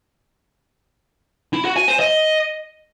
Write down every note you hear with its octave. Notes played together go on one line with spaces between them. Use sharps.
E4
F#4
G#5
C5
D#5